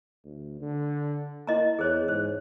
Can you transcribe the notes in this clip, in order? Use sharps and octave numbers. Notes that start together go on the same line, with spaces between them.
D2
D3
A#3 E4 D#5 A#5
E2 G#4 C5 C#5
G#2 C5